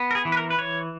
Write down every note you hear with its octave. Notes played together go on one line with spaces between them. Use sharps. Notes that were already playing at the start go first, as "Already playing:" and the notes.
Already playing: B3
A#4
G#4
E3
B4
A#4
B4
E3 C#5